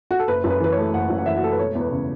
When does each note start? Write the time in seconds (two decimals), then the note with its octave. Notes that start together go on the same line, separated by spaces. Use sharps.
0.11 F#4
0.19 A4
0.28 F#1 B4
0.44 F#2
0.50 B4
0.60 E3 B4
0.72 C#5
0.77 A3
0.94 F#1 F#5
1.10 F#2
1.18 F#5
1.26 E3 E5
1.36 F#4
1.43 A3 A4
1.52 B4
1.58 E1 C#5
1.75 E2
1.81 B4
1.92 C#3